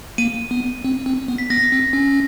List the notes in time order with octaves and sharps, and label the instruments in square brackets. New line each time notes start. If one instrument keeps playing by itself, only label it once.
[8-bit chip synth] A#3 [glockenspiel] D#7
[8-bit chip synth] B3
C4
C4
B3
[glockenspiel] B6
[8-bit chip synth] B3 [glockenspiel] A#6
[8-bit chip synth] C4
C#4